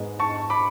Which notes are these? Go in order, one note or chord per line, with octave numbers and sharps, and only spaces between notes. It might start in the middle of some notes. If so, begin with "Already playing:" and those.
Already playing: G#2 G#3 B3
A5 C#6
B5 D6